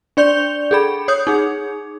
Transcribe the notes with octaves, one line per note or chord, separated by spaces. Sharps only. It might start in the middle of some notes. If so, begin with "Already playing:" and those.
D4 D5 G6 F7 G7
G#4 A4 B5
C#5 D#6 G6
D#4 G#4